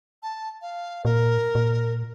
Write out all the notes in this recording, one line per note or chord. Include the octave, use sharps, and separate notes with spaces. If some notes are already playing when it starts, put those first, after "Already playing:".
A5
F5
A#2 A#4
A#2